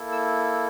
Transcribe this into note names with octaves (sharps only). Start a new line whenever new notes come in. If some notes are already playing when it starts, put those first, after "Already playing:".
Already playing: A#3 E4 A4
E6